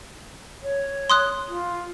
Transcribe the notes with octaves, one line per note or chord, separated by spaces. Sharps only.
C#5
C6 D#6 F#6
F4